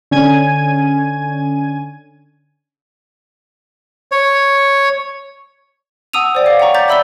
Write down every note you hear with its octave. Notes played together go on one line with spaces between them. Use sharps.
D3 C#4 G#5 G#6 D#7
C#5
F#5 A5 D#6 E6 D#7 F7
C5 D5 G5
C#5 F5 D6
F#5 G5 A#5 C#6
A#5 D6 G6 A6 B6
D5 E5 B5 E6 B6 G7